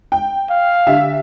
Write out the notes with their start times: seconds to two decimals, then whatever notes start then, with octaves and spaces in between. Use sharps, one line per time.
0.12 G5
0.50 F5
0.87 D3 G4 E5